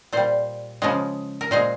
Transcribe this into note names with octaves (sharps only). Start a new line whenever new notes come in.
A#2 G3 C5
C#3 F3 G#3
A#4
A#2 G#3 C5